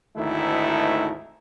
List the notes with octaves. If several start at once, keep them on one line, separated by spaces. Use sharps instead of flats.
G#1 D2 D#3 A3 D#4 E4